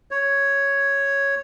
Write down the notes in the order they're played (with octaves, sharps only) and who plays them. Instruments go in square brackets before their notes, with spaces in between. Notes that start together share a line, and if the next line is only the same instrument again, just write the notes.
[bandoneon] C#5